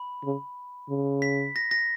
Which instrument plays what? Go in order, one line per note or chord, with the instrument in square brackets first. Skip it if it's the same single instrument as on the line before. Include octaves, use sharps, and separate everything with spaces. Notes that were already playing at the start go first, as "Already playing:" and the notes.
Already playing: [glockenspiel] B5
[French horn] C#3
C#3
[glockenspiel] B6
A#6
A#6